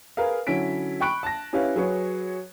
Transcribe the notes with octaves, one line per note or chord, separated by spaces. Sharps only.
G#4 A#4 B4 F5
D3 F#3 C#4 E4 B6 D7
G5 B5 C#6 F#6 D7
A5 A#6
C#4 E4 G4 B4 C#5 F5
F#3 G#4 B4 C#5